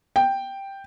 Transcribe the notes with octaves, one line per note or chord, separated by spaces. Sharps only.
G5